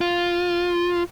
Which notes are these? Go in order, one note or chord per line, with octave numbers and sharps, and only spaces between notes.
F4